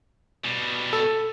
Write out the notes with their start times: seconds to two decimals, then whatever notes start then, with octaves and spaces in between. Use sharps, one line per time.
0.44 B2 G3
0.93 A4